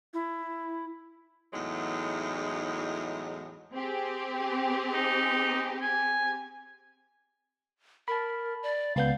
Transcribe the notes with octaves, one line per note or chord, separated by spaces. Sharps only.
E4
E2 A2 F#3 G#3 D#4
C4 G4 G#4
D#4
G#5
A#4 A5 B5
D5
C#2 B3 F5 G6